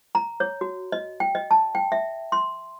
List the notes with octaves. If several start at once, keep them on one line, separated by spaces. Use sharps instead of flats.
A#5
C#5
F#4
D#5
G5
D#5
A5
G5
E5
C6